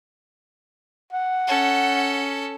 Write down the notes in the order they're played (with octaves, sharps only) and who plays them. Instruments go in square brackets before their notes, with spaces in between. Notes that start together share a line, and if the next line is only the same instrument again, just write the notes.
[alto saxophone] F#5
[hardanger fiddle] C#4 A4